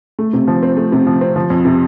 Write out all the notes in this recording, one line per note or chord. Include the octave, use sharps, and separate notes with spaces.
A3
C3
F3
C4
A3
C3
F3
C4
F3
F2
C3